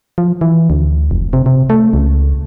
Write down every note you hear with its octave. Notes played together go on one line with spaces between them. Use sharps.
F3
E3
D2
F1
C3
C3
A3
C#2